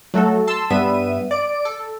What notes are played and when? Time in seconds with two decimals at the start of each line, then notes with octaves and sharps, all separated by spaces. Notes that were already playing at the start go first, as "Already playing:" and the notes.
0.14 F#3 A3 F#4 A4
0.47 A5 C6 E6
0.70 G2 G3 B3 E5 D#7
1.31 D5 D7
1.65 A4